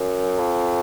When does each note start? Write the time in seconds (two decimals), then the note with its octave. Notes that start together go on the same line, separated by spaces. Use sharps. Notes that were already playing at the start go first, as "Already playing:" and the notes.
Already playing: F#2
0.39 F2